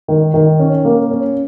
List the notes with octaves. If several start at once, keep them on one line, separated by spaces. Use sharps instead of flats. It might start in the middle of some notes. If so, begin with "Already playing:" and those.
D#3
D#3
C#4
A#3
C#4